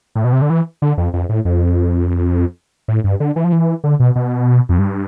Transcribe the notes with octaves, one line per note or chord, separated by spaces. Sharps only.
A2
B2
C3
D3
E3
D3
F2
F2
A2
F2
A2
G2
D3
E3
F3
E3
D3
B2
B2
F2
G2